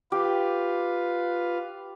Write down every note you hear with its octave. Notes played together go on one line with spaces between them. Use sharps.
F4 G4 B4 F5